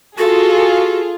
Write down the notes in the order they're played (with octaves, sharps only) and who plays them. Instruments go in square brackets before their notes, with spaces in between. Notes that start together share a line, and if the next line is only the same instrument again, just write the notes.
[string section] F4 G#4 [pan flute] F#4 [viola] A4